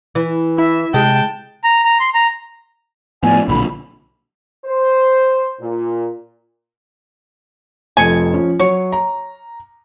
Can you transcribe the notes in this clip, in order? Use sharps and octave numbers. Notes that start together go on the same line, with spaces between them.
E3
E4 E5
C3 G#3 G5 A5
A#5
A#5
C6
A#5
A2 F3 B3 D5 G#5
B1 A#2 D3 B5
C5
A#2
F1 F2 G#5 C#7
F3 C#4
F#3 C#5
A#5